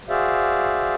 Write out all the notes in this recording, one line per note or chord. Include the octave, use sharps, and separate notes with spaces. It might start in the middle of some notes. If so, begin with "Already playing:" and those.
F#4 G#4 C5 D5 E5 F5